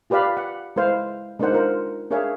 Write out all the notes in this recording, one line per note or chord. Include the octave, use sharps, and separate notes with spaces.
F4 G4 B4 D5 F5 B5
F#5
G#3 E4 B4 C5 F5
G#3 D4 D#4 A#4 C5 F#5
F4 A#4 C5
D4 G#4 A#4 C#5 E5 F5